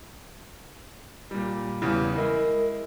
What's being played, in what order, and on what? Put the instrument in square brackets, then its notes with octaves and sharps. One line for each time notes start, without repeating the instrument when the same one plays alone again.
[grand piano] A#2 G3
[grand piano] E2 C#3 G3 [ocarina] E4
[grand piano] G#3 E4 [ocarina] A#4